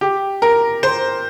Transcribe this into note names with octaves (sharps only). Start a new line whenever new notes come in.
G4
A#4
C5